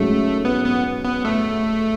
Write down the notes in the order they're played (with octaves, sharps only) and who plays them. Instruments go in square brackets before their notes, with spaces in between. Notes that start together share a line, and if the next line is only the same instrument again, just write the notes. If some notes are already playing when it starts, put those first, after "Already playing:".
Already playing: [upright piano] G#2 F#3 C#4 G#4 [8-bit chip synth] A3
[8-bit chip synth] B3
B3
B3
A3